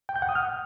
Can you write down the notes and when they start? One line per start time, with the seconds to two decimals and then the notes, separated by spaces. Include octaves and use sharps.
0.09 G5
0.16 G6
0.22 F#5
0.29 D#6
0.35 F6